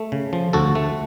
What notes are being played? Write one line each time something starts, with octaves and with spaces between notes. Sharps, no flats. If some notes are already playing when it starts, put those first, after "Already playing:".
Already playing: A3
C#3
F3
D2 F#4 A4
A3